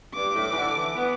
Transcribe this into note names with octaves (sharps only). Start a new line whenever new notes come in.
G2 D6
A2
E3
D3
E3
B3